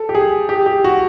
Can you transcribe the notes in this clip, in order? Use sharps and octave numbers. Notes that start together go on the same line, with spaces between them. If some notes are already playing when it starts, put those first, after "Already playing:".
Already playing: A4
G4
G#4
G4
G4
F#4